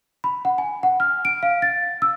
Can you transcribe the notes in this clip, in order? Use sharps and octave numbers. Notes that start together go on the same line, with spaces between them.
B5
F#5
G#5
F#5
F6
D7
F5
A6
E6